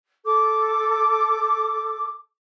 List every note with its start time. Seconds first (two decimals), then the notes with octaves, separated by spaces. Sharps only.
0.25 A4 D6